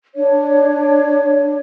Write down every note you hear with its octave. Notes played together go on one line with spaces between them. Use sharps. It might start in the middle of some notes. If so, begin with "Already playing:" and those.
D4 C#5